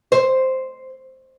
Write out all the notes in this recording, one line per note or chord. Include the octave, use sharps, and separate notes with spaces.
C5